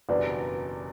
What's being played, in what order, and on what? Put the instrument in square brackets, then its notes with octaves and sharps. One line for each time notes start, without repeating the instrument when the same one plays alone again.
[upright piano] F#1 E2 B2 G3 D4 [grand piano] B4 D5